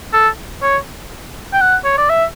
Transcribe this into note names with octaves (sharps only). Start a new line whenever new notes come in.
A4
C#5
G5
F#5
C#5
D5
E5